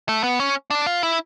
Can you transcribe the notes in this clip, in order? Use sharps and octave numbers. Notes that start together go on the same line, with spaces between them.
A3
B3
C#4
D4
F4
E4